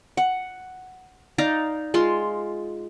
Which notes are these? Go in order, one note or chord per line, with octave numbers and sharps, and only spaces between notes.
F#5
D#4 D5 F5 A#5
G#3 F4 C6